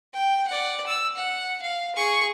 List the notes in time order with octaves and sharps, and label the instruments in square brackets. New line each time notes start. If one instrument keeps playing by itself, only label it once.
[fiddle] G5
D5 F#5
E6
F#5
F5
G#4 C#6